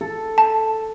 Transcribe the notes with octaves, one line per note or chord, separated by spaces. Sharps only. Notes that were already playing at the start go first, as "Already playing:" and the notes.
A4
A5